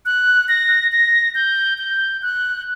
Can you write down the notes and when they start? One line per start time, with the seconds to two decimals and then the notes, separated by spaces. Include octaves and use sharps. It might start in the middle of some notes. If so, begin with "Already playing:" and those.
0.06 F#6
0.49 A#6
0.92 A#6
1.35 G6
1.78 G6
2.22 F#6